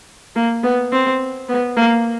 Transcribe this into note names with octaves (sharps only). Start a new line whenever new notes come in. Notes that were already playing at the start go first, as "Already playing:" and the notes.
A#3
B3
C4
B3
A#3